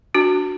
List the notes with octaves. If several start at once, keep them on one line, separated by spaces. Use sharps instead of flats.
D4 F#4